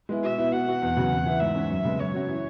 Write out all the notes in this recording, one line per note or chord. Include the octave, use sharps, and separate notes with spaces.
G#3 B3 E4
B2 E5
B3 E4
B2 F#5
B3 F#4
E2
C#3 F#3
E2
E3 B3 E4
G#2 E5
E3 C#4 E4
F#2
C#3 G#3 B3
F#2 C#5
F#3 C#4 F#4
E3